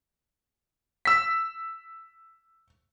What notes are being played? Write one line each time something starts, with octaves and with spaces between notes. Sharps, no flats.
E6 B6